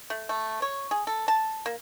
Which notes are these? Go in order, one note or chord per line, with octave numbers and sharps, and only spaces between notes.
A3
A3
C#5
G#4
A4
A5
A#3